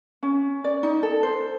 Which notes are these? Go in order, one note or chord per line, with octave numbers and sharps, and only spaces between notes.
C#4
D5
D#4
A4
C5